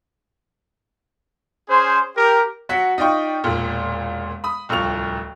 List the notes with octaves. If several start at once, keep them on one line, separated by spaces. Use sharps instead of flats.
C#4 G#4 C5
G4 A#4
F#3 F#4 B6
D#4 F4 D5 D#5 G5 C#6
E1 A#2
B5 D#6
D1 C2 F3 C#6 F7